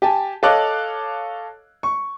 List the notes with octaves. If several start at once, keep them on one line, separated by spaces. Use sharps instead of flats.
G4 G#5 A5
A4 C#5 D#5 F5 D6 F#6
C#6